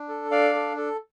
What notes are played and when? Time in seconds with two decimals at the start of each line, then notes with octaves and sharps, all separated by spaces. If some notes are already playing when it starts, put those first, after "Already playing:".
Already playing: D4
0.09 A4
0.31 D4 D5 F5
0.55 A4
0.77 A4